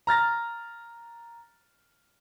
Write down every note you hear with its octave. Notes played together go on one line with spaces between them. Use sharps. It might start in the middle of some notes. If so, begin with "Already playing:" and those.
A#5 F6 A6 A#6